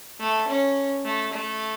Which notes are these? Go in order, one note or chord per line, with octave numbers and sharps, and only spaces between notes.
A3
C#4
A3
A3